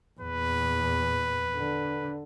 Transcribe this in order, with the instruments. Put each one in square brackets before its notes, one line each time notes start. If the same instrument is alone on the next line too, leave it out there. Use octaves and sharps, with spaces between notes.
[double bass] E2 A#2 [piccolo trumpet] B4
[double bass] D3